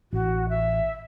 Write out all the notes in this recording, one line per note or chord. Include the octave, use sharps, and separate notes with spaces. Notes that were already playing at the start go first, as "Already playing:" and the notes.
A1 F#4
E5